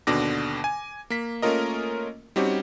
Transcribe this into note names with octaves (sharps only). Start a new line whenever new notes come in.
D#2 B2 D3 D4 D6 A#6
G#5
A#3 B6
A3 A#3 C#4 F4 A#4 D#5
G3 C4 C#4 D#4 F#4 G4